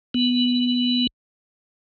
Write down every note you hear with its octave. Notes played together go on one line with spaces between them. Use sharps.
B3